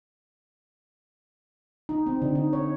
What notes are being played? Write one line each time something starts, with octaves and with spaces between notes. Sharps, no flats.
D#4
C4
D3
D#4
C#5